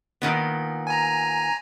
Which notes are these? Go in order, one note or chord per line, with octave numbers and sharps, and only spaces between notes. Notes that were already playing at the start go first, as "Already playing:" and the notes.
A#2 D#3 B3
G#5 A#5